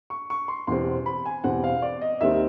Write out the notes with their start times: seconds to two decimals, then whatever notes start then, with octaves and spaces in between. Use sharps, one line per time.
0.10 C#6
0.30 C#6
0.48 C6
0.67 E2 B2 G3 C4 C6
1.06 B5
1.25 G#5
1.44 E2 B2 G3 C4 F#5
1.64 F5
1.82 D5
2.01 D#5
2.21 D#2 D#3 G3 C4 E5